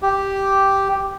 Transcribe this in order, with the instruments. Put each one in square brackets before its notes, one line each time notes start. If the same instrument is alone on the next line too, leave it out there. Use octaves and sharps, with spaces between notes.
[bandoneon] G4